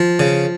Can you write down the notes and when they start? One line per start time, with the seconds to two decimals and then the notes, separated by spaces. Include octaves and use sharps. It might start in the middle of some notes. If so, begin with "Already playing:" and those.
Already playing: F3
0.19 C#3